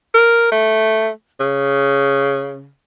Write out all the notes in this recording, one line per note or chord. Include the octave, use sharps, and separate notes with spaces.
A#4
A3
C#3